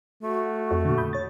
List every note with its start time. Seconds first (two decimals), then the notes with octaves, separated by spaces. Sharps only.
0.23 A3 F#4
0.71 F2
0.85 A#2 D3
0.98 B5 D#6 G6
1.13 C#5 A6